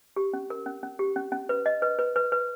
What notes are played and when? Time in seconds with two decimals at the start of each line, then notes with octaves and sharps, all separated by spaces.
0.16 G4
0.33 C#4
0.50 A#4
0.66 C#4
0.83 C#4
0.99 G4
1.16 C#4
1.32 C#4
1.49 B4
1.66 D#5
1.82 B4
1.99 B4
2.16 B4
2.32 B4